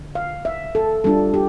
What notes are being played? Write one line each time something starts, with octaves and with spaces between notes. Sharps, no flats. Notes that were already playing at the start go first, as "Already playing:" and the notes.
Already playing: D3
F5
E5
A4
G3 D4 F4 A4
G4